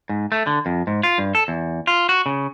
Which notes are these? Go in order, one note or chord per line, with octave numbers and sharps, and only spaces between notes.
G#2
A3
D3
F2
G#2
F4
G2
A4
E2
F4
F#4
C#3